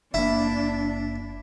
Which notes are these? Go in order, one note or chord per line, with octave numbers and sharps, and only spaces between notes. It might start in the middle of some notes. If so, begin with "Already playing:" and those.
F#1 A#3 D4 E4